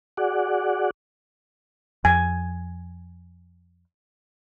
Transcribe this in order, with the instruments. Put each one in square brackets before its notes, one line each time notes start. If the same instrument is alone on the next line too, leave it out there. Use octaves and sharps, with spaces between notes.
[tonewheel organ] F#4 G#4 D5 F#5
[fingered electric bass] F2 [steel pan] G#5